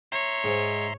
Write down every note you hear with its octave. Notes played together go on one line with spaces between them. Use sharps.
C#5 E5 A#5 C6
G#2